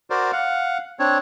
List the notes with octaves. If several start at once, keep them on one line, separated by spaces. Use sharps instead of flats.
F#4 A#4 C5 D5
F5 F#5
C4 D4 C#5